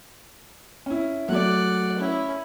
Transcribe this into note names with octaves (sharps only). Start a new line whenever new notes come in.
C#4 E4
F#3 A3 D5 F#5
C#4 E4